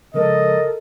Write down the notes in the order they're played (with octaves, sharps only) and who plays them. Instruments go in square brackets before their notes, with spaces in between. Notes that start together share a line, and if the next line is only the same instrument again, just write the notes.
[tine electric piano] C#3 F3 G#3 [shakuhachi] A4 [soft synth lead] A#4 [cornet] D#5